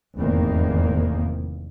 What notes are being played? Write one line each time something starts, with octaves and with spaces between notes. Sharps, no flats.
F1 E2 G#2 D#3 A#3